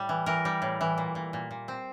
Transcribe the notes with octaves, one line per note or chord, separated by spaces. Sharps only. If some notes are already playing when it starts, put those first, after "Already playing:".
Already playing: A2 G3
E3
E3 A#4
G3
A2
E3
A#2
A#2
A#2
A#2
C4